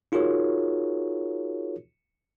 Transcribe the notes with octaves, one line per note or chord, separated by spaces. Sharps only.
D#4 F4 F#4 G#4 A#4 C#5